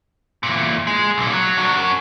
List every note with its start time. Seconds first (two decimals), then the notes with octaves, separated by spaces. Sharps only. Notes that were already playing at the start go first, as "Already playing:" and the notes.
0.43 E2 A#2
0.87 G#3 G#4
1.18 B1 A#2
1.33 F#3
1.58 D4 F#4
1.77 C#4 F#4